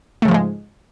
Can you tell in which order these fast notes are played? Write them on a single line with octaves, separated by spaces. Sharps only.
A3 C#3 F3 G#2 G#3